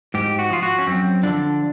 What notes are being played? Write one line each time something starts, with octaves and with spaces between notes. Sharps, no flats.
G#2 G4
F#4
F3 F4
F#4
C#4
F#2 C4
D3 F3 D4